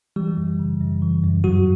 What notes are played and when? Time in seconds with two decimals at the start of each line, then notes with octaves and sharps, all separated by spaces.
0.16 E3 G3 G4
0.37 F#2
0.59 C#3
0.80 F#2
1.02 E3
1.24 F#2
1.44 G2 F#3 F#4